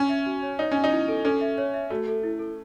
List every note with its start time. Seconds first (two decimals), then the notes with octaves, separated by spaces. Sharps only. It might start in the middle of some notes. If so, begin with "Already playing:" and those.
Already playing: C#4
0.09 E5
0.26 F#4
0.43 C#5
0.59 D#4 C#5
0.72 C#4 G#5
0.84 D#4
0.91 E4
1.08 A4
1.25 C#4 A4
1.41 E5
1.58 C#5
1.74 E5
1.90 A3 F#4
2.07 A4
2.23 E4
2.39 A4